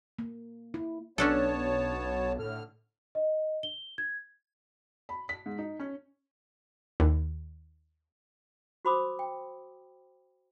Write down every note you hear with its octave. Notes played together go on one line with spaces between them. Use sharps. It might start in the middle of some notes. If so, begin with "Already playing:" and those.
A#3
E4
B1 B3 C#4 D4 A4 C#5 A5
A2 D3 F6
D#5
G7
G#6
B5
B6
G#2
D#4
C#4
D#2
F#4 C5 B5 C6 D6 D#6
G5